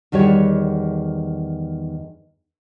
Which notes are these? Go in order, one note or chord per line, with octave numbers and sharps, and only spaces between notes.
E2 D#3 G3 F#4 C#5